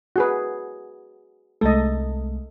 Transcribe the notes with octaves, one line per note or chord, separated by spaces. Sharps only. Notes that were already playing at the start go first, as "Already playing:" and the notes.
F#4 G#4 B4
C2 G#3 A3 A4 D#5